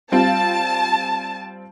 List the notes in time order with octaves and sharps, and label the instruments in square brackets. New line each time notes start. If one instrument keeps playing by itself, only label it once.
[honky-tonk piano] G3 C4 F4 [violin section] A5